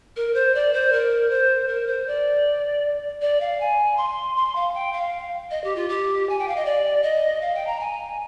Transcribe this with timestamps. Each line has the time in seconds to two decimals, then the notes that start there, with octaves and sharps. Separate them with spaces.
0.16 A#4
0.34 C5
0.55 D5
0.73 C5
0.92 A#4
1.30 C5
1.68 A#4
1.87 C5
2.07 D5
3.21 D5
3.41 F5
3.60 G#5
3.97 C6
4.36 C6
4.56 F5
4.75 G5
4.93 F5
5.51 D#5
5.64 G4
5.76 F4
5.89 G4
6.29 G#5
6.39 G5
6.48 F5
6.56 D#5
6.65 D5
7.03 D#5
7.42 F5
7.55 G5
7.67 A#5
7.80 G#5